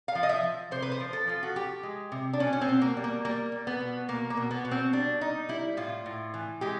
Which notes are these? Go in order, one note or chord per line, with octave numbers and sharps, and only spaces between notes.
F5
F3
D#5
E5
F3
C3 C5
B4
C5
F3
A4
F3 F4
F#4
F3 G4
G#3
C3
D4
B2 C#4
C#4
C4
B2
A#3
G3
A#3
G3 A#3
G3
B3
B2
B2 A#3
A#3
B2
B3
B2
C4
G3 D4
G3 D#4
G3 E4
A2 F4
A2
E3
G#3 G4